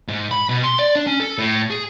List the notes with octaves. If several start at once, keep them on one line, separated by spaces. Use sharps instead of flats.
G#2
B5
B2
C6
D5
D4
C#4
A4
A2
G#4